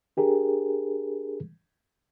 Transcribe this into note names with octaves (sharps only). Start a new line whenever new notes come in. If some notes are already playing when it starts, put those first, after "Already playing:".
D4 G4 G#4 A#4